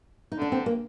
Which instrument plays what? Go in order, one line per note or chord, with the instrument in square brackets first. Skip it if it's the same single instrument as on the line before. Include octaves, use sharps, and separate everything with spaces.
[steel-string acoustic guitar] D#4
[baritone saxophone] D3 [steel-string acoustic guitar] D4
[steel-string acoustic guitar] C4
A#3